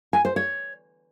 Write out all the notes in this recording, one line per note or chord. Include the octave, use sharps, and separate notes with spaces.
G#5
C5
C#5